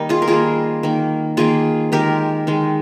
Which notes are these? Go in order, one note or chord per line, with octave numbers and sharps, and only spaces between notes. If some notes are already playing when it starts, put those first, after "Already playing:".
Already playing: D#3 G3 A#3 D#4
F4 G#4
A#4
D#3 G3 A#3 F4 G#4
D#3 A#3
D#3 A#3 F4 G#4
D#3 G#3 G4 A#4
D#3 G#3